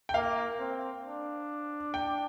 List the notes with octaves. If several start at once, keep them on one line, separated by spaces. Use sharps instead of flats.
G5
A#3 F5
C4
D4
G5